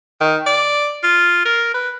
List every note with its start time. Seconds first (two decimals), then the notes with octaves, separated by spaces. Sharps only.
0.21 D#3
0.47 D5
1.04 F4
1.45 A#4
1.74 B4